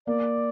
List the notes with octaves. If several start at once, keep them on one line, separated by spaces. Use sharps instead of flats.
A#3 D5